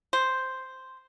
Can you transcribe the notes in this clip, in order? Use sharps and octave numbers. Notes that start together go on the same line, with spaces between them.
C5